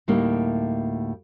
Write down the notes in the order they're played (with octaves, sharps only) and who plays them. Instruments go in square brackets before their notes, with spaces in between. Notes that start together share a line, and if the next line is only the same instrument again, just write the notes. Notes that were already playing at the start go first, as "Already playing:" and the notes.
[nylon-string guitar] D2 A2 G3 A#3 D#4 E4